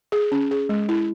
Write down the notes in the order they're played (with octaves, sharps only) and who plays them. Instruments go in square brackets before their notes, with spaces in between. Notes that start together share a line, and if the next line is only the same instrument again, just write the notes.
[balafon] G#4
C#4
G#4
G#3
E4